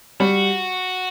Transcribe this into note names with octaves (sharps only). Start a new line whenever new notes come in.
G3 F#4